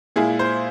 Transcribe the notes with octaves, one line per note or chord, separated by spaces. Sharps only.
A#2 G#3 E4 G#4
C5